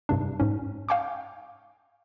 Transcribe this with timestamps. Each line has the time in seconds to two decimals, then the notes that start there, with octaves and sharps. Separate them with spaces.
0.09 G2 C3 D4
0.40 G#2 C#4
0.89 F5 G5 G#5 C#6 D6